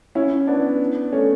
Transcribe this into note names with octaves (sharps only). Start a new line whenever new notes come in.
C#4 E4
B3 D4
A3 C#4